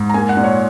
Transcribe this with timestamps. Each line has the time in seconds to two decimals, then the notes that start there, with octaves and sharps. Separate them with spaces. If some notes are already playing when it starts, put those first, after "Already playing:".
Already playing: G#2
0.10 A#5
0.14 A#3 G#5
0.29 F#5
0.37 A#2
0.44 C#5